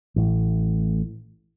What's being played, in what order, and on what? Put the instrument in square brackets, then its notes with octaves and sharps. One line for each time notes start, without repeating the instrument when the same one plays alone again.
[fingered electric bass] A1 A2